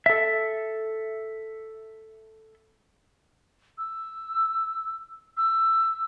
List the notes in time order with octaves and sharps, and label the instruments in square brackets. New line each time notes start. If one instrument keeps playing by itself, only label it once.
[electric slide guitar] A4 E5
[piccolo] E6
E6